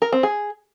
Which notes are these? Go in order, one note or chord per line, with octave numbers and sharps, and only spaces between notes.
A#4
C4
G#4